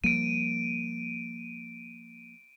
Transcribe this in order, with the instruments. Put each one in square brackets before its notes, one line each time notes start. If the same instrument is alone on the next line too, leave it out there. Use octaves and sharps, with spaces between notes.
[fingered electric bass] F3 G3 A#3 [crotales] D7 D#7